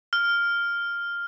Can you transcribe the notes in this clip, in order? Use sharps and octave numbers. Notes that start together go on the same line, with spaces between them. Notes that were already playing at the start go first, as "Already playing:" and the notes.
F6